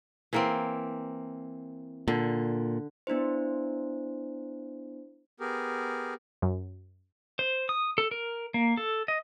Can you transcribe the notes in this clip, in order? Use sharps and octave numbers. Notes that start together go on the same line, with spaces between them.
E3 A#3 C4
A#2 D3
B3 D4 E4 C5
B3 G4 G#4 A#4
F#2
C5
D#6
A4
A#4
A#3
A4
D#5